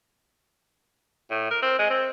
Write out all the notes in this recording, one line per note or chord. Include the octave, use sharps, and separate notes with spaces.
A2
A#4
C4
G#3
C4